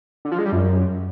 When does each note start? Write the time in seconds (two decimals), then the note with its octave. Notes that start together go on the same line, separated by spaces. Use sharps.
0.25 D3
0.32 F3
0.39 G#3
0.45 G3
0.52 F#2